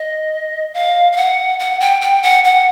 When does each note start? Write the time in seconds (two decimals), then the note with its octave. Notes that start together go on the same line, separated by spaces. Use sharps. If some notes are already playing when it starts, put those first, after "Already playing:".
Already playing: D#5
0.74 F5
1.12 F5
1.17 F#5
1.59 F#5
1.80 G5
2.01 G5
2.23 F#5
2.44 F#5